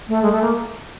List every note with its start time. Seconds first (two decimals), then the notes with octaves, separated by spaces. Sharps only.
0.08 A3
0.22 G#3
0.32 A3
0.42 A#3